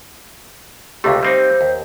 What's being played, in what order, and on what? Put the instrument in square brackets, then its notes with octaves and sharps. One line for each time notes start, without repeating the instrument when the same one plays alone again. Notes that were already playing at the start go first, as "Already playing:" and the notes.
[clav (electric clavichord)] C#2 C3 A3 [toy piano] G4 E5 F5
[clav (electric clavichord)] G3 C4 D#4 [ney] C5
[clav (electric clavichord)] D#2